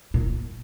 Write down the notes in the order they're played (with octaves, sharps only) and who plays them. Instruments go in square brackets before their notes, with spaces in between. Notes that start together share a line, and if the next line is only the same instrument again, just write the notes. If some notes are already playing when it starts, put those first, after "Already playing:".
[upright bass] A#2